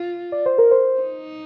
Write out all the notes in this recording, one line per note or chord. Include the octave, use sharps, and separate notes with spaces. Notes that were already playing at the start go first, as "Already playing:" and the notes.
Already playing: F4
D5
C5
A#4
C5
D#4